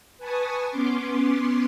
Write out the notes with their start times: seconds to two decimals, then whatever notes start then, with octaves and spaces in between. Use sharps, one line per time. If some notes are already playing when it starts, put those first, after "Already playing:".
0.18 B4 G#5 A5 C#6 D#6
0.69 B3 C#4 C6 D6